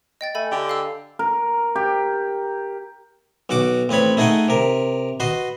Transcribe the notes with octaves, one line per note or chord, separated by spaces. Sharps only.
D#5 G5 A6
A3 G#5 B5
D3 G4
F5 E6
A#4
G4
B1 F#4 F#5 D6
A1 C4 B4 C#5 B5
A3 D#4 G#4 D#5 F#5 G5
C3 A#4
F#4 B4 D#5 C6